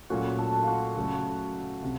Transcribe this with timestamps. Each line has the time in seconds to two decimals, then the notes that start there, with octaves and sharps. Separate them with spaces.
0.10 A#2 F#3 A3 C#4 F#4
0.38 A4
0.63 F4 F#4
0.96 C#3 F#3 A3
1.83 C3